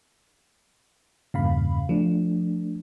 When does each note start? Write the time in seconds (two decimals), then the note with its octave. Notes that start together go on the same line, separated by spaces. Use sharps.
1.34 E2 G2 A#2 C#3 F5 B5
1.89 F3 A3 D4